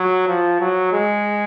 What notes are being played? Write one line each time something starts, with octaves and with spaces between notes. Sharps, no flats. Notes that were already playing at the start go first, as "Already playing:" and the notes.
Already playing: F#3
F3
F#3
G#3